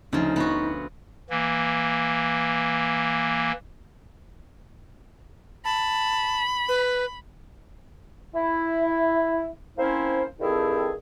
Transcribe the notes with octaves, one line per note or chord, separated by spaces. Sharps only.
D2 C#3 F3 D#4
B3 F4 F#4
E3 A#3
A5 B5
B4
E4
A#3 C4 C#4 E4 C5
G2 D#3 C4 E4 G#4 A4